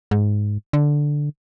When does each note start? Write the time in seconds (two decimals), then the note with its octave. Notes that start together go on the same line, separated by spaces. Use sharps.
0.11 G#2
0.73 D3